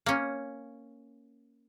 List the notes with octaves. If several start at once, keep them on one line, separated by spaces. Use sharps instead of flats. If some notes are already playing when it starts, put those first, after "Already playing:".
A#3 C#4